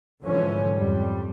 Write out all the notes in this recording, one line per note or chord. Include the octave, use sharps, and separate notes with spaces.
G#2 D3 E3 F3 C#4
F2 G3